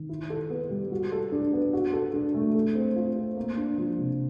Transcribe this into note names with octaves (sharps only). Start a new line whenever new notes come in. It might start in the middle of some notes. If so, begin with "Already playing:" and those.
Already playing: D#3
E4
A4
B3
G3
F#4
A4
D4
B3
F#4
A4
D4
A3
A4
C4
F4
C4
A#3
D4
F3
C3